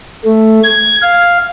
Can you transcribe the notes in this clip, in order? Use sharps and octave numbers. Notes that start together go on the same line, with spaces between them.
A3
G#6
F5